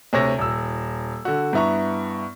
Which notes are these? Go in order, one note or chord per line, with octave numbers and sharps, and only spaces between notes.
D2 C3 C#5 A#6
D#1 E6
D3 F#4
G2 B3 E4 A#5 C#6